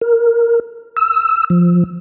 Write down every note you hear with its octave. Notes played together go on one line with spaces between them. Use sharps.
A#4
E6
F3